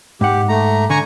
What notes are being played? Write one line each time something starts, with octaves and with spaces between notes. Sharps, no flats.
G#2 G4 F#5
A3 A#5
D3 G#5 A#5 C#6